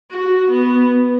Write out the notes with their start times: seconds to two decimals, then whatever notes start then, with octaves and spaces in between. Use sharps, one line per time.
0.11 F#4
0.51 B3